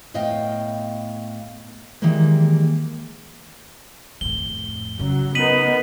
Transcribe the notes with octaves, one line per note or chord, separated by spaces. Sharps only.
A2 B3 D#5 F5 G5
D#3 E3 G3 G#3 A#3
F2 A2 G7
C#3 F#3
B3 D#4 A#4 B6 D#7 F#7